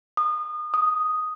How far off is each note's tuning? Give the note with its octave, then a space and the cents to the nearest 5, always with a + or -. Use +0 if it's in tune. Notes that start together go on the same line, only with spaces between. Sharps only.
D#6 -30
D#6 +0